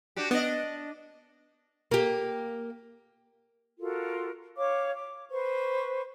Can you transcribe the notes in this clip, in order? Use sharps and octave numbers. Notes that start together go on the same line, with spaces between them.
D4 F#4 G4
B3 D4 D#5
A#3 G4
F4 F#4 A4 A#4
C#5 F5 D6
D6
B4 C5 C#6